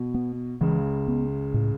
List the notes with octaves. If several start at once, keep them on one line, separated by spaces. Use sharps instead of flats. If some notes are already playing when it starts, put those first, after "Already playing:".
Already playing: B2
B3
C#2 C#3 E3
B3
A2